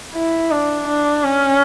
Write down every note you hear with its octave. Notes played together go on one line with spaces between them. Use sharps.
E4
D4
D4
C#4